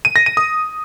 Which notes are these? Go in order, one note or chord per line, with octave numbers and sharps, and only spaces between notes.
D#7
A#6
D#7
D#6